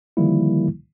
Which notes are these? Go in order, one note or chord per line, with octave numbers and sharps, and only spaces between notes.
D3 D#3 F3 G3 A#3 E4